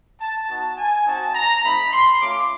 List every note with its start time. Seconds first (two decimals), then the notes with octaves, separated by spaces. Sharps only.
0.20 A5
0.49 B3 D#4 F#4 A5
0.77 G#5
1.06 C4 D#4 F#4 A5
1.35 A#5
1.63 A3 C4 D#4 B5
1.92 C6
2.21 A3 C#4 F4 D6